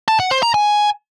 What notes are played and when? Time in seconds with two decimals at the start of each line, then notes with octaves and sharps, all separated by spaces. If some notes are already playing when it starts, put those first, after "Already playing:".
0.08 A5
0.20 F#5
0.31 C5
0.43 A#5
0.54 G#5